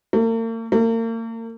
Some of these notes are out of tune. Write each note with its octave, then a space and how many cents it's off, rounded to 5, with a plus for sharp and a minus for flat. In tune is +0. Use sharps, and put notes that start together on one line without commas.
A#3 -45
A#3 -40